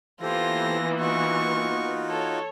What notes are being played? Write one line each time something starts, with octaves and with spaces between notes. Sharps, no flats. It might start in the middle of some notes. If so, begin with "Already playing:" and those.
E3 A#3 B3 F4 G4 A4 C5 A#6
D#4 F4 F#4 C#6
A4 C#5